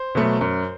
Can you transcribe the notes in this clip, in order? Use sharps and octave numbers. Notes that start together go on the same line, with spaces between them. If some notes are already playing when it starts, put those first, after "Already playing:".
Already playing: C5
B2 F#3 A3
F#2